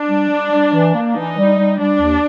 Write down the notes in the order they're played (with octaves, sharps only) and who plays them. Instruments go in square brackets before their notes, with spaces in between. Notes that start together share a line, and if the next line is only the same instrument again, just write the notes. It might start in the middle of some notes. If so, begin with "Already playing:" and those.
Already playing: [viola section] D4
[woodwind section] G3
G3
G3
E3
A#3
[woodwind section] E3 [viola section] D#4
[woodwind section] G3
G3
[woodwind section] G3 [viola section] D4
[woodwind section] D#2